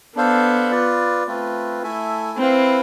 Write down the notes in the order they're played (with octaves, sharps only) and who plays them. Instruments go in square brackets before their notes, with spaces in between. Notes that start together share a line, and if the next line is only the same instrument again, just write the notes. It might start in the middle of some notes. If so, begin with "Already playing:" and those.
[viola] B3 [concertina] D4 A4 C5 F5
[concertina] F4 B4 D5
A3 C4 F4 B4
A3 E4 A4 E5 G#5
[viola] C4 [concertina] E4 B4 F5